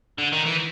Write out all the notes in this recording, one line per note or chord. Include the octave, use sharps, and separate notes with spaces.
D3
D#3
E3